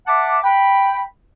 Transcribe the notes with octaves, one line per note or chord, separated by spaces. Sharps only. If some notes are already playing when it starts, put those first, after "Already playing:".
E5 F#5 A5 D6
G5 B5